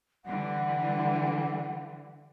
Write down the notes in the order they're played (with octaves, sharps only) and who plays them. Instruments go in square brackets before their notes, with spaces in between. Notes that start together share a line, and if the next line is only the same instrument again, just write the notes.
[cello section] D3 E3 G3 [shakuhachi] F#5